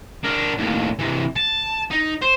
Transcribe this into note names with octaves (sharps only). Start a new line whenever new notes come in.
D4 A#4
D#2 A2
C3 E3
A5
D#4
C5